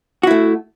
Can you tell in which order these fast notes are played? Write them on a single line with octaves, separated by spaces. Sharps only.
F#4 E4 A3